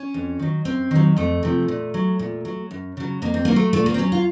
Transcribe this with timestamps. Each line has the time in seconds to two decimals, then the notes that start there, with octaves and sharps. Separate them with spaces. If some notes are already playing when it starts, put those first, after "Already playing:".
Already playing: C#4
0.14 F2
0.39 D#3 F#3
0.65 F#2 C4
0.91 D#3 F#3
1.16 F2 A3
1.43 C3 F3
1.68 A#2
1.94 F#3
2.19 A#2
2.45 F#3
2.71 F#2
2.97 C#3 F#3
3.22 F2 A#3
3.34 C4
3.45 D#3 A#3
3.51 F#3 A3
3.73 A#2 A3
3.86 A#3
3.94 C4
3.98 F#3 C#4
4.12 F4